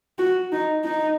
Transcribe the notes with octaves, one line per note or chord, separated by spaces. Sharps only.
F#4
D#4
D#4